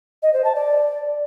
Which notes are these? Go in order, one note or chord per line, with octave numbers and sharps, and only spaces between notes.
D#5
C5
A5
D5